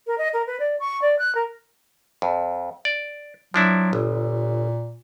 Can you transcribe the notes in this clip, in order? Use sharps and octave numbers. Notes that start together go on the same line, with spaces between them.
A#4
D#5
A#4
B4
D5
C#6
D5
F#6
A#4
F2
D5
F3 F#3 D4 E4
G1 A#2